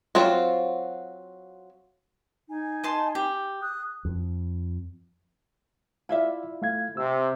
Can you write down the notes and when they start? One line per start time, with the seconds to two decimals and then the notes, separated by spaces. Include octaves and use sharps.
0.15 F#3 C4 F4 F#4
2.49 D#4 G#5
2.84 D#5 A5 C6
3.15 G4
3.60 D#6 F#6
4.05 F2
6.09 E4 F4 D5 E5 F5
6.62 A3 F5 G#6
6.97 C3 E6